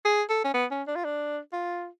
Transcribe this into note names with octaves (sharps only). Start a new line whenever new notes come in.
G#4
A4
C#4
B3
C#4
D4
F4
D4
F4